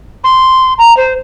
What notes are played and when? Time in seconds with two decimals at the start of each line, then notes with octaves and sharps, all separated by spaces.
0.23 C6
0.78 A#5
0.96 C5